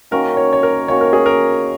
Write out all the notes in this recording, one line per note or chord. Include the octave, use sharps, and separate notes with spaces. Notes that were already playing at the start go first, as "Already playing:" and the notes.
D#3 A#3 C#4 F#4 A#4
C#5
C#5
A#4
D#3 A#3 C#4 F#4 C#5
A#4
G#4
A#4